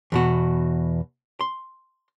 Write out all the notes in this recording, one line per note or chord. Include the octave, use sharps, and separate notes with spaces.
E2 B2 F#4
C6